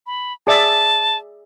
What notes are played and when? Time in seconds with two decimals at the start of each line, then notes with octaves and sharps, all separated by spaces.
0.07 B5
0.47 G#4 D5 E5 A5